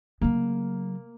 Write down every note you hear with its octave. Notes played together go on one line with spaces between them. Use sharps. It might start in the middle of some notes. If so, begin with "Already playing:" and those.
C#3 F#3 A#3